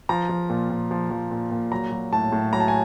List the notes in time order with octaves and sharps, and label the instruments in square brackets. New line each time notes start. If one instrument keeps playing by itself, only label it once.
[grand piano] F3 A#5
F3
A#2
A#2
F3
F3
A#2
A#2
F#3 A#5
F#3
A2 A5
A2
F#3 A#5
A5
G#5